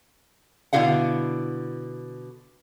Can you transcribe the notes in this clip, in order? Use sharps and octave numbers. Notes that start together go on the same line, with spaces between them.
B2 D3 E4 G4 F5 F#5